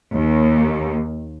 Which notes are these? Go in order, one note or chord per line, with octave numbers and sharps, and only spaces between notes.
D#2